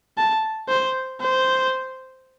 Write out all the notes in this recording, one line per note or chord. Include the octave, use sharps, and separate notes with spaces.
A5
C5
C5